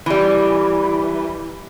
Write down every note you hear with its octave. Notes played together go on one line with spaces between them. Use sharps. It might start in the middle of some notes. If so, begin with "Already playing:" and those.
E3 G3